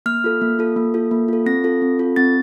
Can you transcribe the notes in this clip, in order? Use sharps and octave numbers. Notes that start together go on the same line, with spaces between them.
A#3 F6
F4 A4
A#3
F4 A4
A#3
F4 A4
A#3
F4 A4
C4 A#6
F4 A4
C4
F4 A4
C4 A6